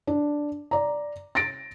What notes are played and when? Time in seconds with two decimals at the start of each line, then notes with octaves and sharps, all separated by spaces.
0.07 D4
0.71 D5 A#5
1.35 A6 A#6 D7